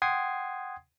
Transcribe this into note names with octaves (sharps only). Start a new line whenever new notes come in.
F#5 G5 C6 D#6 G#6 C7